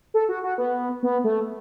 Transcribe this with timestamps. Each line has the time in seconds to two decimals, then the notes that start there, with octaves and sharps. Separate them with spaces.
0.14 A4
0.29 F#4
0.43 F#4
0.58 B3
1.03 B3
1.24 A3